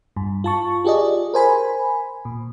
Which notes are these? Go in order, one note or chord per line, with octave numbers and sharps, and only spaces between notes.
G2
F4 A5 C#6
F4 G4 G#4 D5 D#5
A#4 C5 G#5 B5
A#2